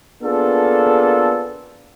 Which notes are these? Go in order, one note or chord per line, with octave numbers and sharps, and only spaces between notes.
A#3 B3 D4 F4 G#4 A4